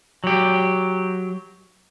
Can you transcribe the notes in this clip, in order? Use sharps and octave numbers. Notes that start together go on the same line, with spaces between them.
F#3 G4